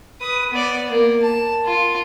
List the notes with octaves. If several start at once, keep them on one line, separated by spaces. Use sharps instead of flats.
B4 D#6
B3 D5
A#3
A5
F4